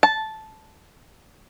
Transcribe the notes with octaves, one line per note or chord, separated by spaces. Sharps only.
A5